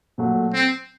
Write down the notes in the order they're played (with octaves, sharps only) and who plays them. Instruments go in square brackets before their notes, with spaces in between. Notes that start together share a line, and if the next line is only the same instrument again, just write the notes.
[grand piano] A#2 F#3 A3
[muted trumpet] C4